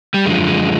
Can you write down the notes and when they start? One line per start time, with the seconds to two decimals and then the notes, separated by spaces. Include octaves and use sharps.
0.14 G3
0.25 F#2 D3 F3 G#3
0.47 G#3